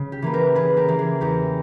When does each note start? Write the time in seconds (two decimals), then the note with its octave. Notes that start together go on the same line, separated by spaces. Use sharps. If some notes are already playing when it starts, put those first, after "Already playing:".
Already playing: C#3
0.12 G4
0.22 E3 A#3 B4
0.34 G4 A#4
0.55 C#3 G#4 B4
0.77 G4 A#4
0.88 E3 A#3
0.99 G#4
1.21 E2 G4 A#4